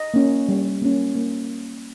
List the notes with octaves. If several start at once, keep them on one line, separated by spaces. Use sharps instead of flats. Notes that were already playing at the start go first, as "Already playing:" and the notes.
Already playing: D#5
A#3 C#4
G3
A#3 C#4
A#3